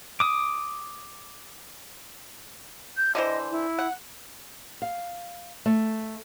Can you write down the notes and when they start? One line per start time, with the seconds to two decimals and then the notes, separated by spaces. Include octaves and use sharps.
0.20 D6 D#6
2.97 G6
3.15 D3 E3 C5 D#5
3.51 E4
3.79 F#5
4.82 F5
5.66 A3